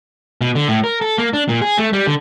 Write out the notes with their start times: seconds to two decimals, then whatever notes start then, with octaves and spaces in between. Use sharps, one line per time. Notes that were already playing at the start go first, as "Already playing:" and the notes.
0.41 B2
0.55 D3
0.68 A2
0.84 A#4
1.01 A4
1.18 A#3
1.33 D4
1.49 A#2
1.61 G#4
1.78 A3
1.93 G3
2.07 D3